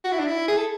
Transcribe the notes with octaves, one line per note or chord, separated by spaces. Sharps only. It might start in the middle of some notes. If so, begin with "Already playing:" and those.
F#4
E4
D4
E4
G#4
A4